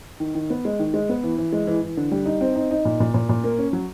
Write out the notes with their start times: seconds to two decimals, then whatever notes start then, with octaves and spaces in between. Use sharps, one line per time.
0.20 D#3
0.35 D#3
0.50 B3
0.65 G#3
0.79 D#3
0.94 G#3
1.09 B3
1.24 E3
1.38 E3
1.53 G#3
1.67 E3
1.82 E3
1.97 D3
2.12 G3
2.26 D#4
2.41 C4
2.56 D#4
2.71 D#4
2.85 A#2
3.00 A#2
3.14 A#2
3.29 A#2
3.44 A#3
3.58 C#4
3.73 F#3